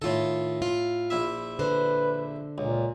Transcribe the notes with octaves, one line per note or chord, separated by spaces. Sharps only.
A2 D#3 F4 A4
F4
A#1 E4 E5
D3 B4 C5
C#2 A#2